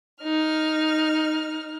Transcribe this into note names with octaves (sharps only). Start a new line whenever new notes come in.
D#4 F6